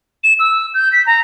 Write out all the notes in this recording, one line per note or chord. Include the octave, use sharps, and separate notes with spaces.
E7
E6
G6
B6
A#5